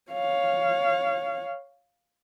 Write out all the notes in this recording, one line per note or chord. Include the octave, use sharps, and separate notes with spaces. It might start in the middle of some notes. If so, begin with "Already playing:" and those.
C#5 F5